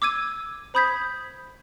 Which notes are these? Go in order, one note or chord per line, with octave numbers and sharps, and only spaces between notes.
D6 E6 G#6 D#7
C5 B5 D#6 G6 G#6 B6